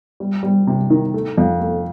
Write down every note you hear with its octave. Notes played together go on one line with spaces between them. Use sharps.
G3
G3
C3
D#3
A3
F2
A3